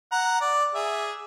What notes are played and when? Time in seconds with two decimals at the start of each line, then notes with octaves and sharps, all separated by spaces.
0.12 F#5 A#5
0.41 D5
0.75 G#4 E5